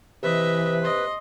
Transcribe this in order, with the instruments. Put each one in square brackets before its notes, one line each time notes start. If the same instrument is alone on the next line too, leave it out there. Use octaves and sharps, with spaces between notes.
[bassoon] C3 [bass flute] E3 [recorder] B4 [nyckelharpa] D#5 E5
[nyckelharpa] D#5 C6